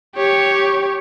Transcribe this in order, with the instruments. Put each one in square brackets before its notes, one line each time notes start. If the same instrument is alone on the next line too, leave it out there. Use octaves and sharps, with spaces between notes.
[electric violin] G4 C#5